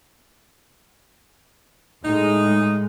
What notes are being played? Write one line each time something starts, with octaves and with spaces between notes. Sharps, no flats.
A2 G#3 D#4